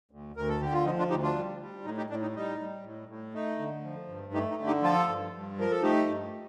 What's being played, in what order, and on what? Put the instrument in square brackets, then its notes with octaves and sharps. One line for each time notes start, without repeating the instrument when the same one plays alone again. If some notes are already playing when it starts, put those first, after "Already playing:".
[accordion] D2
D2 A#4
A4
D3 G4
F4
F3 D#4
D4 F4
D2 D#4 G4
D4 F4
G3
G3
A2 D#4
D#4 G4
A2 D4
D#4
G3 D#4
G3
A2
A2
A3 D#4
D3
F3
G2
A3 D#4 G4
D#4
D3
D#4 G4
F3 F4 A4
G2
G2
F3 A#4
A4
A3 D#4 G4
G2